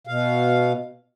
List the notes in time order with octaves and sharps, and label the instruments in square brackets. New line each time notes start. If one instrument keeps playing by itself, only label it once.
[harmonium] B2 F5